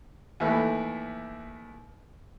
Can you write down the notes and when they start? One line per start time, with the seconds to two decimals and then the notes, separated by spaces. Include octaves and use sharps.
0.40 D#2 E3 A3 B4